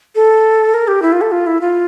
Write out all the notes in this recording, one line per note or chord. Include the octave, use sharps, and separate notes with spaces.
A4
A#4
G4
E4
F4
A4
F4
E4
F4